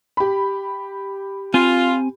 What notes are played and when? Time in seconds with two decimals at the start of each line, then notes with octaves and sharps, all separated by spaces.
0.17 G4 B5
1.54 C4 F4 G#5